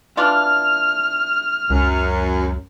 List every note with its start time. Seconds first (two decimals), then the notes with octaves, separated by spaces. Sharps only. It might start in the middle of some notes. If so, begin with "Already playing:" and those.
0.17 E3 D4 F4 F6
1.70 C#2 F#2